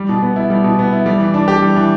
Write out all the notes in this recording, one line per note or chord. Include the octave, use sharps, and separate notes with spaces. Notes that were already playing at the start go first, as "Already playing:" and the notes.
Already playing: G3
B2
B3
E4
G3
B2
B3
E4
G3
E3
D4
G4
G3
E3